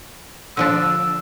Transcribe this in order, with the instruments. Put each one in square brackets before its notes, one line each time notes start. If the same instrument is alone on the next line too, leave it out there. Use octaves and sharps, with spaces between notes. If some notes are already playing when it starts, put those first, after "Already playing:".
[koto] D3 F3 D4 [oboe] E6